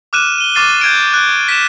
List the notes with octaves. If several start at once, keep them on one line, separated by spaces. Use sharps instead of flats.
D6 F6 F#6 D#7 E7
D#7 G7
C#6 D6 F6 A6 C7 D#7
G6 G#6 D7
F#6
B6 E7